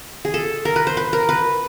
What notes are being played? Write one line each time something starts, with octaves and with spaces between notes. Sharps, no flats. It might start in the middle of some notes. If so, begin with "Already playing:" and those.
G#4
A4
A#4
B4
C5
B4
A#4
B4